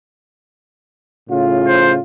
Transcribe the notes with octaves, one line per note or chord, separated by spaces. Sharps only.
A2 C#3 F4
C5